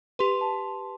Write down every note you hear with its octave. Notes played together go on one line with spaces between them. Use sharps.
G4 B4 C6
A5